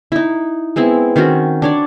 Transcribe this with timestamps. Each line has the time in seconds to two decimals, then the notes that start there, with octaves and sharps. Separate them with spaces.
0.12 D#4 E4
0.76 G#3 B3 C4 E4
1.16 D#3 C4 C#4 F#4
1.62 D4 C#5 D5